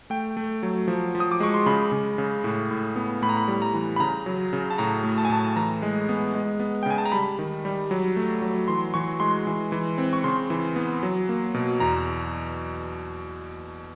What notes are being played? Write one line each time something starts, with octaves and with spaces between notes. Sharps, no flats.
A3 G5
A3
F#3
F3
F3
D#6
D6
G#3 C#6
C6
C#3 B5
C#3
C#3
A2
A2
B3
A2 B5
A#5
B5
G3
A#5
E3
B5
C#3 A#5
F#3
C#3
A5
A2 A#5
A3
A5
G#5
A2 A5
E3 A#5
G#3
B3
G#3
B3
G5
C#3 G#5
A5
A#5
G3 B5
D#3
G3
F#3
A3
F#3
E3 C6
E3 C#6
G#3 C6
E3
E3
C4
C#6
C#3 C6
E3
B3
F#3
A#3
B2
E2 A#5